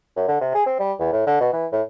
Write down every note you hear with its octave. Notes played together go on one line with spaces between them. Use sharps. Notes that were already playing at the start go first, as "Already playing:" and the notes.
F#2
D3
C3
G#4
C4
G3
E2
A2
D3
B2
E3
A2